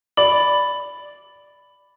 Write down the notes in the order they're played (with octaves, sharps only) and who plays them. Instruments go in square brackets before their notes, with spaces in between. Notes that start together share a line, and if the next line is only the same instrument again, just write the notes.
[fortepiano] D5 [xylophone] B5